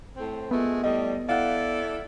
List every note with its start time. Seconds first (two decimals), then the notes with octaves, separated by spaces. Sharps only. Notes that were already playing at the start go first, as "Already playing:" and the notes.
0.17 A2 C4
0.51 A#2 G#3 A3 B3
0.83 A2 G3 D#5
1.29 E4 A4 D5 F5 F#5